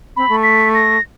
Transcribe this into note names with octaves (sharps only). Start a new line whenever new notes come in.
C4 B5
A3
B6
A#6